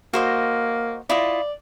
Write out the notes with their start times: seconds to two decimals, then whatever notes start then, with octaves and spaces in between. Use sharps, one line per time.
0.13 A#3 F#4 C5 D#5
1.10 E4 F4 D5 D#5